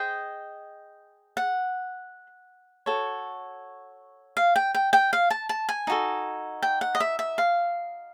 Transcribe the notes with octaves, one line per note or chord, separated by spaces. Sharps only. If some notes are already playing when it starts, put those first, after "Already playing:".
Already playing: G#4 C5 D#5 G5
F#5
F#4 A4 C#5
F5
G5
G5
G5
F5
A5
A5
G#5
D#4 F#4 A4
G5
F#5
D#5
E5
E5
F5